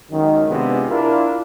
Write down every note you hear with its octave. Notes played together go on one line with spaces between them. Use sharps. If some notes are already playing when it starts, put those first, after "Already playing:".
C#2 F#2 D#3
C3 G#3 B3 D4 F4
D4 E4 F4 A#4